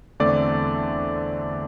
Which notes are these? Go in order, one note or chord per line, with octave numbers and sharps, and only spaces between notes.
E2 D3 A3 C4 D5